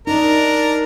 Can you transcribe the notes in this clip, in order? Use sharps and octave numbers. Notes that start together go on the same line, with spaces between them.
D4 D#4 A#4